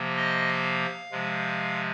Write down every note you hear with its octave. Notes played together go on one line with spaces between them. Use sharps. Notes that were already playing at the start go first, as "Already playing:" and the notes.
Already playing: C3 F3 A#3
D#5
F5
C3 F3 G#3